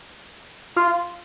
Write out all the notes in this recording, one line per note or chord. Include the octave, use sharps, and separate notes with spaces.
F4